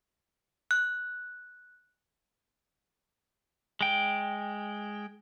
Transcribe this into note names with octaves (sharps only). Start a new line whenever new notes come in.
F#6
G#3 G5